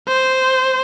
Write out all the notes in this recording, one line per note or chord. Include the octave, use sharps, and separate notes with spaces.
C5